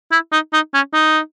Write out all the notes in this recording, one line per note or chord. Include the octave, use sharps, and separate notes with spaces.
E4
D#4
D#4
C#4
D#4